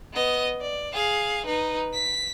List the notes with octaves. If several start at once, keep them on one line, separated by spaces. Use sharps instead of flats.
B3 D#5
D5
G#4 F5
D#4 B4
B6